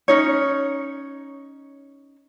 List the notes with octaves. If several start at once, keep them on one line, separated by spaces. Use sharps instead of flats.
C#4 D#4 C#5